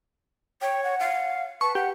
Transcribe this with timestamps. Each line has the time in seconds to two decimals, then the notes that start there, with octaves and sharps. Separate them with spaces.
0.61 C#5 G5
0.84 F#5
1.00 F5
1.61 B4 A5 C#6
1.75 G4 F#5